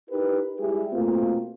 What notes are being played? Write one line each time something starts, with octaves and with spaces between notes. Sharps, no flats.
D#4 E4 G4 A#4 B4
G3 G#3 E4 G4 G#4
B2 A3 A#3 C4 F4